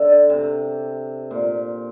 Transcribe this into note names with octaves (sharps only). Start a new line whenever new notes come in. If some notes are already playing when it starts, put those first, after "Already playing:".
Already playing: D3
C3
A#2